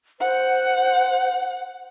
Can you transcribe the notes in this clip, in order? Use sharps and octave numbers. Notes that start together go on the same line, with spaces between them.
C5 F#5